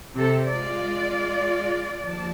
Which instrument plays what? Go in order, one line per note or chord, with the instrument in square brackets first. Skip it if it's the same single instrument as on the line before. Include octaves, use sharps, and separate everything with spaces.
[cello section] C3 A4
[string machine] G#3 F4 [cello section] D5
[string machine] D#2 F3 A5